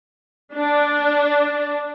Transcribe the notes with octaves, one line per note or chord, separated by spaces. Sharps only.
D4